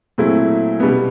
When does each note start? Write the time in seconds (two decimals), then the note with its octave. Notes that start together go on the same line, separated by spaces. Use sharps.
0.18 A#2 F#3 A3 C4 E4
0.80 B2 G3 B3